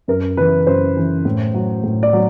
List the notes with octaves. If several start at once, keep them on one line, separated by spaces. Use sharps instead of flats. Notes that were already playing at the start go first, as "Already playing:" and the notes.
F#2 A#4
C#3 E3 B4
F#2 C5
C#3 E3
A2
F#3
A2
D5
F#3